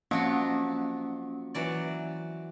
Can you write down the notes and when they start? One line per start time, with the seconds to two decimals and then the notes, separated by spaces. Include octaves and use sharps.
0.11 F3 F#3 A#3 C4 C#4 F#4
1.54 E3 F#3 D5